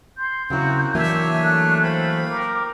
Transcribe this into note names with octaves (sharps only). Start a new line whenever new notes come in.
C6 G6
C#3 F#3 A#3 C4 E4 F#4
E3 F#3 A#3 D4 C#5 E5 G#5
A3 F#6
C5 F5 G5 B5
A#4 D6